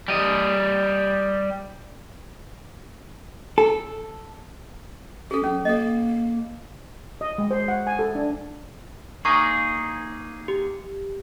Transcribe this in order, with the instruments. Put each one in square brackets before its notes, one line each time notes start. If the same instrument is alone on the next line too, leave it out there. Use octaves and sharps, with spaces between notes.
[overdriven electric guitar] G3 D#5
[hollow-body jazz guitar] A4
[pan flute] C#4 [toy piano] G#4 A4
[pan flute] F#3 [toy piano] C#4
[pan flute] A#3 [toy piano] A4 D#5
[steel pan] D#5
G#3
C5
F#5
G#5
A4
D4
[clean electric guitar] A#3 D#4 G#4 [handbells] C#6
[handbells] G4